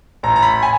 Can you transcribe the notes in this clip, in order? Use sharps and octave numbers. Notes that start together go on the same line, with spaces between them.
A1 A#5
A#5
B5
G#5